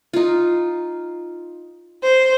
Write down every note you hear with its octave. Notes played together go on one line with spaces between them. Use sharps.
D#4 F4
C5